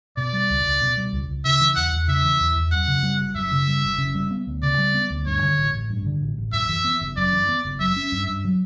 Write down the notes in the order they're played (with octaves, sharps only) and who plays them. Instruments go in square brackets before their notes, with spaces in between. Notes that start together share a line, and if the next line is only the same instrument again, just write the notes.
[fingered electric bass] B2 [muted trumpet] D5
[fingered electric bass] G3
C#2
C#2
B2
G3
C#2
C#2
[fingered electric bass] C#3 [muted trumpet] E5
[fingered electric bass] E3
[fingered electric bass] E2 [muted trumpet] F#5
[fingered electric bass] E2
[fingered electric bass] C#3 [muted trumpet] E5
[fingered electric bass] E3
E2
E2
[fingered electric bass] F#2 [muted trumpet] F#5
[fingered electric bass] C#3
G3
F#1
[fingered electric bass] F#2 [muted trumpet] E5
[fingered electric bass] C#3
G3
F#1
C#3
G3
B3
D2
[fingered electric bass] C#3 [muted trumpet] D5
[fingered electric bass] G3
B3
D2
[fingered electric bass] G2 [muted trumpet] C#5
[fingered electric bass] D3
A1
A1
G2
D3
A1
A1
[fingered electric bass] F#2 [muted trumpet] E5
[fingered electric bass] E3
B3
F#1
[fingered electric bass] F#2 [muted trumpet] D5
[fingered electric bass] E3
B3
F#1
[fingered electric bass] F#3 [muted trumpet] E5
[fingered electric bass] C#4
G2
G2
F#3